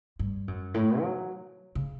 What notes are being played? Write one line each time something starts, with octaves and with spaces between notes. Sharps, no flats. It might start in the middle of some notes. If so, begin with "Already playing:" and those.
G2
F#2
A2
F#3
C#3